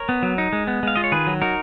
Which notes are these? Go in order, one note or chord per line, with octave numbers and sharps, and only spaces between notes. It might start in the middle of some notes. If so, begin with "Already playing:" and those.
Already playing: A#4 C#5
B3
F#3
D#4
G#3
B3
G#3 F5
F4 D#5
C#5
D#3 G#4 B4
F#3
D#4 F#4 A#4